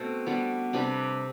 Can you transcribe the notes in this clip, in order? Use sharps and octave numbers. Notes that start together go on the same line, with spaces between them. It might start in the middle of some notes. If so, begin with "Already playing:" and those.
Already playing: B2 A3 C4 D4 C5
B2 G3 B3 D4
C3 G3 D4 B4